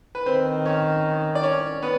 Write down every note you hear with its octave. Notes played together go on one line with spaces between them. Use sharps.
B4
D#3 C4 C5
C#4 C#5
D5
C#4 C#5
B3 B4